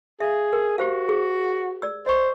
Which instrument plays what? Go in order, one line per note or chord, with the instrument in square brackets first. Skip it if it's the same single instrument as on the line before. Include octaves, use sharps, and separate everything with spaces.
[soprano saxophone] G#4 [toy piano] E5 F5
[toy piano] A#4
[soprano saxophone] F#4 [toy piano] G4 C5 F5
[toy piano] G#4
D5 E6
[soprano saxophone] C5 [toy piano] D#5 C#6